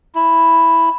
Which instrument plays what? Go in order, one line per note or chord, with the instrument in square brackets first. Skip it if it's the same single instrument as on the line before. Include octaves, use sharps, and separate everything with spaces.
[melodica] E4